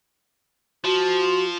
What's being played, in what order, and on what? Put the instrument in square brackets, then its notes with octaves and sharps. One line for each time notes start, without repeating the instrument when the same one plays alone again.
[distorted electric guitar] F3 [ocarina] F#4